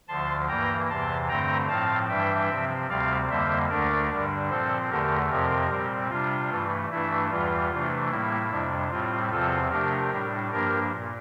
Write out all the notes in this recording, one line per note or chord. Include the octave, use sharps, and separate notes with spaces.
D2 D3 F3 A5 C6
G2 E3 A#3 G5 A#5
E2 C3 E3 A5 C6
G2 D3 A3 C4 G5 A#5
A2 F3 C4 F5 A5
G2 E3 G3 D4 E5 G5
C3 F3 C4
D2 C3 G3 C4 D5 F5
F2 D3 G3 A#3 C5 E5
D2 D3 A3 D4 A#4 D5
G2 D3 G3 D4
A#2 F3 C4 A4 C5
E2 D3 A3 G4 A#4
F2 C3 F3 C4 G4 A#4
A#2 G3 C4
C3 G3 D4 F4
G2 E3 A3
G2 E3 A3 D4 E4
E2 E3 G3 F4
C3 E3 A3 D4
A2 G3 A#3 E4
F2 C3 G3 D4
A2 G3 C4 F4
E2 C3 F3 C4 F4 A4
C3 F3 A3 D4 G4 A#4
A2 G3 D4
G2 F3 A#3 D4 G4 A#4
A#2